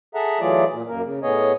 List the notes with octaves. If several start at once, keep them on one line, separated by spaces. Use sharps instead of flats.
G#4 A4 E5 F#5 A#5
E3 F#3 A3 F4 G#4 D5
A#2
F#2 A#3 A#4
C#3
A2 B3 G#4 C#5 D#5